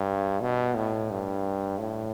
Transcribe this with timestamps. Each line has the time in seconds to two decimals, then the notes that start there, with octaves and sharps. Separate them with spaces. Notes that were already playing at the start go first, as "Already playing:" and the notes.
Already playing: G2
0.41 B2
0.75 A2
1.10 G2
1.79 A2